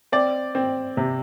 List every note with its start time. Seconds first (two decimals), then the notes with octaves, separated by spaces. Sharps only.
0.12 C4 D5
0.55 C4
0.97 C3